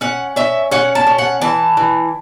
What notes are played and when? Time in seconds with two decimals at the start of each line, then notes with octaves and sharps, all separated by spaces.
0.01 C#4 F#5
0.36 C#4 E5
0.72 C#4 F#5
0.95 A5
1.07 C#4
1.18 F#5
1.42 E3 A5
1.77 E3